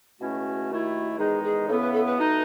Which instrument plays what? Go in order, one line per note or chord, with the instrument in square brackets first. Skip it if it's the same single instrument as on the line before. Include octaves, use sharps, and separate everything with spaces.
[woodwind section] C#2 B2 A3 C#4 E4 [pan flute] F#4
[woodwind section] D#2 D#3 A3 E4
[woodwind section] E2 D#3 G#3 D#4 [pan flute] G#4
[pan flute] G#4
[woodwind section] C#3 E3 B3 E4 [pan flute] A4
[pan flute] B4
A4
B4
[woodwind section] B2 A3 D#4